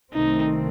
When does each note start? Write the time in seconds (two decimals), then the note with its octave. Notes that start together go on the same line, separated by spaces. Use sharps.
0.14 C2 C3 D#3 A3 C4 D#4